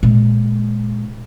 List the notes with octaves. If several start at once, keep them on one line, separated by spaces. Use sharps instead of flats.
A#2 G#3